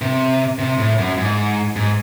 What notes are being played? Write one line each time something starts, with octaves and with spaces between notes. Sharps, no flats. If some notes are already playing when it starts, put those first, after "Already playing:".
C3
C3
A2
F#2
G#2
G#2